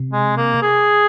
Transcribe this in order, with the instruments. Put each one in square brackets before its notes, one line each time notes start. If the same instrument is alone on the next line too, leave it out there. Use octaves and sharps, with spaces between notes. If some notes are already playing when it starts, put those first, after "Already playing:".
Already playing: [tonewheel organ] C3
[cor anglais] G#3
A#3
G#4